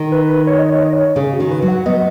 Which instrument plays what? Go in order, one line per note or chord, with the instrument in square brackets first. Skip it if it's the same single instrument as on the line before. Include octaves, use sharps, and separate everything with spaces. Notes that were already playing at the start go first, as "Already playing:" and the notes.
Already playing: [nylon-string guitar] D#3
[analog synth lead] B4
C#5
D#5
C#5
D#5
C#5
[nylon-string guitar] C#3 [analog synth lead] G#4
[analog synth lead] F#4
[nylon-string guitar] D#3
[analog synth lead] B4
[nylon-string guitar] F#3
[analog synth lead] F#5
[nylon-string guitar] B3 [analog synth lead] D#5